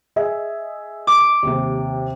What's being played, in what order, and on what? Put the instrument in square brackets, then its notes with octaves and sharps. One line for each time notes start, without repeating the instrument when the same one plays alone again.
[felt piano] G#4 D#5 E5
[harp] D6
[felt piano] D#2 C3